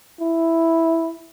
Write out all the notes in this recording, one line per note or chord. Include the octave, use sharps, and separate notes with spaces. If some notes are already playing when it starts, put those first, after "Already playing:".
E4